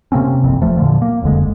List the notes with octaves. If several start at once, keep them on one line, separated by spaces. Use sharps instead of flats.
C3 A#3 C4 C#4
G1 C2 F2 C4
E2 F3 A3
A#2 D3 F3
A#3
F#1 F2 D3 G#3